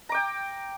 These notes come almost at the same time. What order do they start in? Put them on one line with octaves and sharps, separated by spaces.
A#5 D6 G5